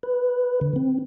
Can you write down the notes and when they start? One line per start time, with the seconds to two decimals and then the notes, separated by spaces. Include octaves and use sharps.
0.03 B4
0.61 D3
0.76 C4